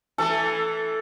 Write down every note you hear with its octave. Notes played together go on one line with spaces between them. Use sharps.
E3 A3 A4